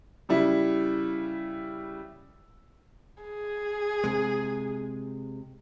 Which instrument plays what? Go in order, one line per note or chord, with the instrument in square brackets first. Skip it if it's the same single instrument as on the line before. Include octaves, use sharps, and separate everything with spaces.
[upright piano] C#3 G3 E4
[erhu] G#4
[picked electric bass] C3 G#3